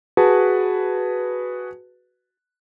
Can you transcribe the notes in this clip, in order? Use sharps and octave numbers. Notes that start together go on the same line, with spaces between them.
F#4 G#4 B4 A5